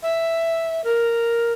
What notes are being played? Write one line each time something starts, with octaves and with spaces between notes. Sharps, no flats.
E5
A#4